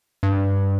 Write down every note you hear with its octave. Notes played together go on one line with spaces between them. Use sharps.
G2